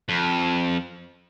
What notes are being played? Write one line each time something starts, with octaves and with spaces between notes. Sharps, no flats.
F2